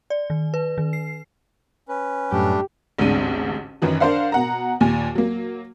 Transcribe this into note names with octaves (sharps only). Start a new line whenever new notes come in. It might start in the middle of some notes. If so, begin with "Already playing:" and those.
D5
D#3
B4
D#3
C7
C#4 B4
F#2 A2 G3 A3 D4 G4
A1 D2 G#2 C4 D4 D#7
F#2 D#3 E3 F#3
D4 A#4 C5 F5 F#5
B2 F#5 A#5
D#2 A#2 G#5
F#3 A#3